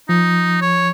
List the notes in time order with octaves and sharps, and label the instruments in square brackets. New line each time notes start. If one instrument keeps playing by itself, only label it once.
[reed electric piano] F3 [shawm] D#4
[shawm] C#5